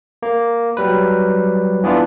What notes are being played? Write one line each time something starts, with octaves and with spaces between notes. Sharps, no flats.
A#3
F#3 G3 B4
E3 B3 D4 F4